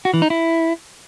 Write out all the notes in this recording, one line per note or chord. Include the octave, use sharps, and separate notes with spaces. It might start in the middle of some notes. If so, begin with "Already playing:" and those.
F#4
E3
D#4
E4